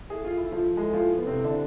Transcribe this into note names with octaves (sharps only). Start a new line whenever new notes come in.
E4 G#4 A4 E5
F4
E4
F3 F4
G#3 E4 G#4 A4 E5
F3 F4
B3
C3 C4
D3 D4 E4 A4 E5